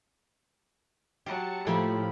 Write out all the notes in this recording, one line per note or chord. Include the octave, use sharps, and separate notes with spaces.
F#3 G4 A5 C#7
A2 F3 A3 A#3 G4 B5